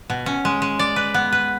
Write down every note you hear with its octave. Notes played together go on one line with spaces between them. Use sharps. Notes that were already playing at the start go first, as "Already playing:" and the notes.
B2
C#4
G#3
G#3
D5
B4
B3
B4